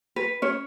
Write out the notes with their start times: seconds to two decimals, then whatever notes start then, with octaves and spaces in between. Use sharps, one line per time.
0.16 B4
0.42 C#4 C#5